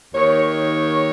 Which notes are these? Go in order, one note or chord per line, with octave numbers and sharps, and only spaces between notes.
D#2 D#3 C#5